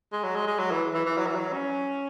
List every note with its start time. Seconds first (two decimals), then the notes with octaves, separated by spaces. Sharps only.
0.13 G#3
0.24 F#3
0.36 G#3
0.48 G#3
0.59 F#3
0.71 E3
0.94 E3
1.06 E3
1.18 F#3
1.27 E3
1.35 F#3
1.53 C#4